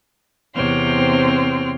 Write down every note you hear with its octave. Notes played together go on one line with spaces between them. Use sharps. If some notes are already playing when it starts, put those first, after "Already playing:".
E2 C3 C4 C#5 C6 F6